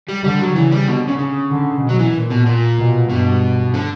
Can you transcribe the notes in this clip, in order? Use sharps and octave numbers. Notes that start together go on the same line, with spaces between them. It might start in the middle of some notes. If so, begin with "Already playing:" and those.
G3
D3 G3
F#3
C#3 E3
G3
B2 D3
C#3
C#3
D3
B2
F#3
E3
A#2
B2
A#2
B2
G2 B2
D3